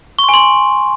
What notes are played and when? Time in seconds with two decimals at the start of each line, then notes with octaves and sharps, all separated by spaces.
0.19 C#6
0.24 C6
0.29 G#5
0.34 C6